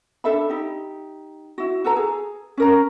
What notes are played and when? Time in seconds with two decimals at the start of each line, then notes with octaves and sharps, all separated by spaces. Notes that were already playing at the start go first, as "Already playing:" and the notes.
0.24 D4 A4 E5 B5
0.50 D#4 G4
1.58 E4 F#4
1.84 F#4 A4 B4 A#5
1.96 G#4
2.57 C#4 A#4 A#5